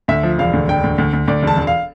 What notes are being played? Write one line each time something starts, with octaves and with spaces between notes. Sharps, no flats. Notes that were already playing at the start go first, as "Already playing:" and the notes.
D2 E5
F3
E1 F5
D2
E1 G5
D2
D2
D2
D2 D5
E1 A5
E1
F5